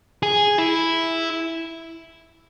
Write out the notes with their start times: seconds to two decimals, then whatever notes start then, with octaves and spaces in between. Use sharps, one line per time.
0.23 G#4
0.58 E4